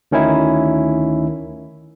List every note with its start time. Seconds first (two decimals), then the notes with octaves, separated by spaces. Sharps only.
0.11 D2 D#3 C#4 D#4 E4